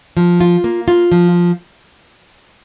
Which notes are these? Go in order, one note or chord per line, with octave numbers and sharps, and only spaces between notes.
F3
F4
A#3
F4
F3